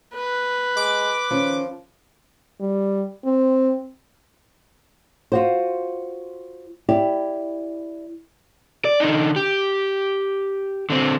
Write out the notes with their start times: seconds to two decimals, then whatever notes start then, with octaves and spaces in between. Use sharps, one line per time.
0.14 B4
0.77 G#3 D6
1.30 D#3 F3 C#4 A#4
2.60 G3
3.25 C4
5.32 F4 F#4 C5
6.88 E4 G4 D5
8.85 D5
9.00 D3 D#4
9.36 G4
10.90 D3 C4